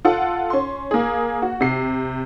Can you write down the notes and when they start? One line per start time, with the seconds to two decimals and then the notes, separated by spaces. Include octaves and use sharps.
0.05 F4 A4 F#5
0.50 C#4 C6
0.91 A#3 G#4
1.42 F#4
1.61 C3 C7